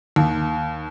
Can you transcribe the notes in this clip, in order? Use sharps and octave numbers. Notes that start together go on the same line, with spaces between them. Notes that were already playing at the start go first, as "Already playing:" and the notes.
D#2